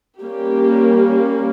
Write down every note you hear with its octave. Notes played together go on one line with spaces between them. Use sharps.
G3 A#3 C#4 G4